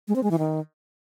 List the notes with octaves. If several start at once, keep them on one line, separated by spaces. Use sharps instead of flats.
G#3
C4
G#3
E3
D#3